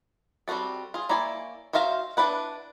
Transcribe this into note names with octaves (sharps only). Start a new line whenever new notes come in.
G3 C4 F4 F#4 A4
F4 G#4
A#3 E4 C#5 D5 G#5
F#4 C5 E5 F5 A#5
D4 E4 B4 F#5